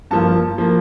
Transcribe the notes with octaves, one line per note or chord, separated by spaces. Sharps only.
G2 F3 A#3 A5
F3 A#3